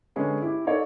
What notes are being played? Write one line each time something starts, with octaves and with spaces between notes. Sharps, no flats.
D3 G#3 C#4 G#4 B4
E4 G4
D#4 A4 C#5 D5